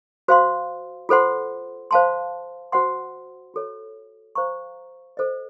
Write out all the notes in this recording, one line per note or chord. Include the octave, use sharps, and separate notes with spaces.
F#4 C5 F5 C6
F4 A4 C5 F#5 C6
C5 F5 A5 C6
F#4 C5 F#5 C6
F#4 A4 C#5
C5 F5 A#5 C#6
A4 C5 D#5